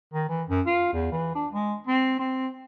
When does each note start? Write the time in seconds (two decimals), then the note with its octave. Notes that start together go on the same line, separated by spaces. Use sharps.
0.14 D#3
0.29 E3
0.49 F#2
0.66 F4
0.93 E2
1.12 E3
1.35 D4
1.53 G#3
1.87 C4
2.19 C4